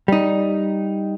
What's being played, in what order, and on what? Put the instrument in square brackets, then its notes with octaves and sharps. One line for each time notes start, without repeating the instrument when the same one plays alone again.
[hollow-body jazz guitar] G3 D#4